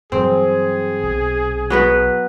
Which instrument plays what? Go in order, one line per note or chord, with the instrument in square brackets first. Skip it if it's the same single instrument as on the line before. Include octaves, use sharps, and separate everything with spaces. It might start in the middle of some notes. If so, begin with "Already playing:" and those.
[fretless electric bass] G2 E3 F#3 [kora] C4 [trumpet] G#4
[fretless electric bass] B1
[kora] F#3 B3 B4